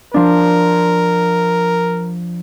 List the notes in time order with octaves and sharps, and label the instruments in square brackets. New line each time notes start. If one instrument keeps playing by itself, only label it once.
[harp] F3 D4 [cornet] A#4